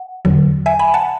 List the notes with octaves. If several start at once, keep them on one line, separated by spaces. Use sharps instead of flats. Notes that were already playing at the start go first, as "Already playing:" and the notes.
Already playing: F#5
E2 D3 F#3
E5 G#5
G#5 B5
F#5 A5